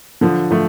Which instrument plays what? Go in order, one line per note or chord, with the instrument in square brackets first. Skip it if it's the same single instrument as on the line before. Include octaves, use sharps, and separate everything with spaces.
[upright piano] D3 F3
F3 A3